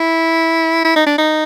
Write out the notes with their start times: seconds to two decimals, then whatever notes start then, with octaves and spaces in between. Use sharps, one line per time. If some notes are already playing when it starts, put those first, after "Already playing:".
Already playing: E4
0.85 E4
0.96 D#4
1.07 D4
1.18 D#4